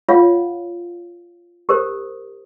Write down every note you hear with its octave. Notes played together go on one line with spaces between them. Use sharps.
F4 C#5 F5 F#5
G4 A#4 C5 D#6